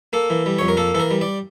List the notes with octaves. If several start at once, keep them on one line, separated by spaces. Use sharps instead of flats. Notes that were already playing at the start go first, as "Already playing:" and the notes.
A#3 A4
E3
G3
F2 C#5
A#4
A#3 A4
E3 A4
A#4
G3
D5